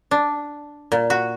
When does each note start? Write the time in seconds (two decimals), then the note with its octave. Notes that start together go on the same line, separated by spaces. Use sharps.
0.11 D4
0.92 A#2
1.10 F#4